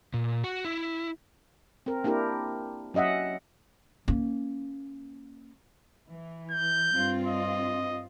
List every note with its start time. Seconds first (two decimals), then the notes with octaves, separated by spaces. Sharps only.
0.14 A#2
0.44 F#4
0.65 E4
1.86 C4 A#4
2.04 A#3 D4 E4 G4 A#4
2.94 F#3 C#4 D#5 E5 F#5
4.08 A#3 C#4
6.10 E3
6.51 G6
6.92 G2 C4 F4
7.27 D#5